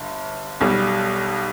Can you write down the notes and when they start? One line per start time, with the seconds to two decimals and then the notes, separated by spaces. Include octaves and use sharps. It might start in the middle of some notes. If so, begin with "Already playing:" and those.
Already playing: G1 G2
0.60 B1 B2 G3